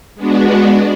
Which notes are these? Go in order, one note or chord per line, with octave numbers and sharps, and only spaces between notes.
G#3 B3 D4 F#4